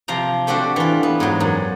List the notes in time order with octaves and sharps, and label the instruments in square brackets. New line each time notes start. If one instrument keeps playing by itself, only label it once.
[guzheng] C3 F3 A#5
A3 C4 D4 F#4 G4
E3 F4
B3
G#2 F#3
F#2